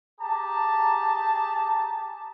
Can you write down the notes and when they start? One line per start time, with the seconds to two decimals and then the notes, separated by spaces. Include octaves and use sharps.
0.20 G4 G#4 A5 A#5